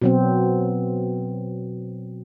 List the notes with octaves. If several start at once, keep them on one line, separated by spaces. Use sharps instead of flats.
B2 F#3 C4